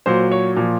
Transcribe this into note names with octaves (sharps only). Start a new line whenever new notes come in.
A#2 F#3 C5
C#5
A#2 F3